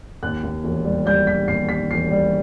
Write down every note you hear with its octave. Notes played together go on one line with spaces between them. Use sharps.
D#2 F#6
D#2
E1
G3
G3 G6
E1 B6
D#2 C7
D#3 B6
E1 C7
G3